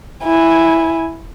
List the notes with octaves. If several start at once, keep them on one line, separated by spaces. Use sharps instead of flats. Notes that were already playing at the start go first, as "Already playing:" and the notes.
E4 G#5